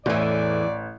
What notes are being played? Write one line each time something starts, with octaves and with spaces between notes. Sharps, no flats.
A1 E2 A2 E3 D5